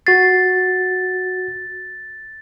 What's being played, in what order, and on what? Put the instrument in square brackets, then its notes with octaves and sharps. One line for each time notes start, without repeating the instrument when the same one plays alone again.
[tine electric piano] F#4 C7 [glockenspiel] A6